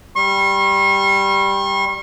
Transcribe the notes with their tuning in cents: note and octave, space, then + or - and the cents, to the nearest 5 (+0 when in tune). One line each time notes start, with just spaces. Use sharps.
G3 +0 C#6 -45